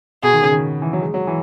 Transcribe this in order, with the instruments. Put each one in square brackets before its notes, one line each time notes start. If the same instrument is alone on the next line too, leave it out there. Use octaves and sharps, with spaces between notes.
[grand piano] B2 [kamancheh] G#4
[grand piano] D#3
C#3
D#3
E3
F#3
G#3
F#3
E3